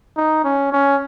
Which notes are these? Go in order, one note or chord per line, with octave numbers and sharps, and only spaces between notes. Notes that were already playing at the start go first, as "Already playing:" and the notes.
D#4
C#4
C#4